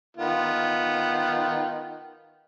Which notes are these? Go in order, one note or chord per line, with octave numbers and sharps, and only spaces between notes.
D#3 B3 F4